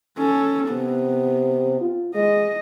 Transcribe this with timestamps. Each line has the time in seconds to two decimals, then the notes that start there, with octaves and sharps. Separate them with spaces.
0.18 C#4 A4
0.69 C3 B3
1.81 F4
2.15 G#3 D#5